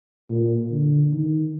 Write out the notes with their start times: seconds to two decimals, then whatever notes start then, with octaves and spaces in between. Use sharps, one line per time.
0.30 A#2
0.71 D3
1.12 D#3